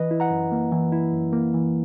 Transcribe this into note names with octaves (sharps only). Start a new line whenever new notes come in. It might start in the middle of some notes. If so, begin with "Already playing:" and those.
Already playing: E3 B4 D#5
E4
F#5 A#5
F#2
A#3
E3
E4
F#2
A#3
E3